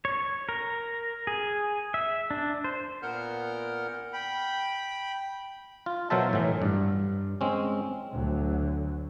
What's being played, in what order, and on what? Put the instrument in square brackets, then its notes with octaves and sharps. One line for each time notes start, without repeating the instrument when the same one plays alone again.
[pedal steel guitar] C#5
A#4
G#4
E5
D4
C5
[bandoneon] A#2 B3 A#4 F#5 F6 G6
[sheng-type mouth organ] G5 B5
[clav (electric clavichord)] F4
B2 F#3 A#4 C5 E5 A5
A2 E3
G2
G#3 C4 C#4
[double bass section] D2 D3 F#3